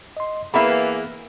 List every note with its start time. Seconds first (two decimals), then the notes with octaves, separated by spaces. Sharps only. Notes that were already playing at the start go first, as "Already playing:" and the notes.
0.17 D#5 C6
0.54 E3 A#3 B3 G#4 E5 A#5 B5